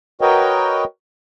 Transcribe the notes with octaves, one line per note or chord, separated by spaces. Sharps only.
F#4 A#4 B4 C#5 D#5 G5